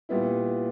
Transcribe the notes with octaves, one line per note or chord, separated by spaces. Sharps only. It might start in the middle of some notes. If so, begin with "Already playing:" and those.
A#2 G3 B3 E4